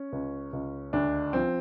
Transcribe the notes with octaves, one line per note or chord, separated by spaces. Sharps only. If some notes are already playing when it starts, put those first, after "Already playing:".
Already playing: C#4
C#2
C#2
D2 D4
F3 C4